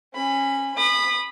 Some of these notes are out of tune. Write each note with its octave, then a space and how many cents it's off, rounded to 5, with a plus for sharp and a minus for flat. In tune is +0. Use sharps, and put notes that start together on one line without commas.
C#4 -20 B5 +15
B5 +0 D#6 -35